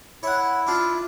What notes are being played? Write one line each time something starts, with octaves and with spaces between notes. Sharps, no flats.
E4 C#5 F#5
D4 F4